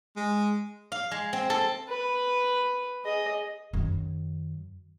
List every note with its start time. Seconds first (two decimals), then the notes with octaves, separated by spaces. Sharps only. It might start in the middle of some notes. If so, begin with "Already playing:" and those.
0.16 G#3
0.92 F5
1.11 G#3
1.33 C4
1.50 A4
1.89 B4
3.05 G#4 D#5
3.73 F#2 D#3